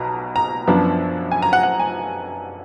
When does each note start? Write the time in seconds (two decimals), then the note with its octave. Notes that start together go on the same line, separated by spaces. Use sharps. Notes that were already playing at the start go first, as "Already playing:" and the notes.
Already playing: B1 B2 A#5
0.36 A#5
0.68 F#2 F3 B3 D4
1.32 G#5
1.42 A#5
1.53 F#5
1.63 F#5
1.80 G#5